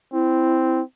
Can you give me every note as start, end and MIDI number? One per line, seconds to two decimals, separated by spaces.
0.13 0.83 60
0.13 0.81 64